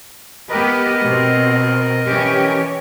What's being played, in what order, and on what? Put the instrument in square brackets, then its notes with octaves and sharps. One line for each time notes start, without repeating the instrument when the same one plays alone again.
[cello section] B3 G4 B4 [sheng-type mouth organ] A#4 D#5
[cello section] B2 C4
E3 C#4 G4